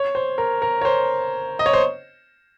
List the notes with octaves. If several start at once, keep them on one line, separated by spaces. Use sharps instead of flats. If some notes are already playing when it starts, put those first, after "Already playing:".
Already playing: C#5
C5
A#4
A#4
C#5
C5
D#5
C#5
C5